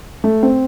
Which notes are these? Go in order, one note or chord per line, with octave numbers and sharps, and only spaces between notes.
A3
C4